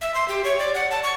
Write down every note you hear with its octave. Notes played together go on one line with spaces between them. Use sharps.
E5
C6
G4
C#5
D5
F#5
A5
C#6